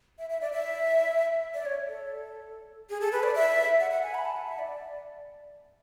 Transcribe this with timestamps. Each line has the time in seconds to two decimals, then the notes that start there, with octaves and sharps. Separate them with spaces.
0.18 E5
0.30 E5
0.41 D5
0.52 E5
1.54 D5
1.65 C#5
1.88 A4
2.90 G#4
3.01 A4
3.12 B4
3.23 D5
3.35 E5
3.80 F#5
3.91 F#5
4.03 G#5
4.14 B5
4.25 A5
4.36 F#5
4.47 E5
4.59 D5